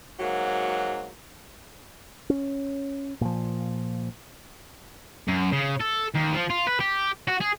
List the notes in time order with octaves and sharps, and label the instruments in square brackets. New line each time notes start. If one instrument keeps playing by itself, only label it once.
[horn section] G#2 F#3 A#3 F#4
[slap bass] C#4
A#2 F3
[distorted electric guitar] F#2
C#3
A4
D#2
F3
F4
B4
G4
F#4
G#4